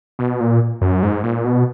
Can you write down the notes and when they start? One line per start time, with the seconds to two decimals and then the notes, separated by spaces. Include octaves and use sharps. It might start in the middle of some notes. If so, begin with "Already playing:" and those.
0.19 B2
0.40 A#2
0.81 F#2
1.03 G#2
1.23 A#2
1.45 B2